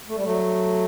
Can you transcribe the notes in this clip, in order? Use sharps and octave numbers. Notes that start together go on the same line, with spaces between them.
A3
G3
F#3 A3